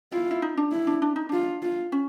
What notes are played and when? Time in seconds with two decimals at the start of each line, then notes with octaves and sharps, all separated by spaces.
0.12 E4 F4
0.31 E4
0.42 D#4
0.57 D4
0.72 E4
0.87 D4
1.02 D4
1.16 D#4
1.29 D4 F4
1.62 F4
1.92 C#4